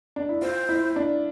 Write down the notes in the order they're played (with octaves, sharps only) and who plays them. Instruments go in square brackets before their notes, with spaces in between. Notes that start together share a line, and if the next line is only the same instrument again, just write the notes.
[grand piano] D4
E4
[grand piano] F4 [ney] C5
[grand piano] E4
D4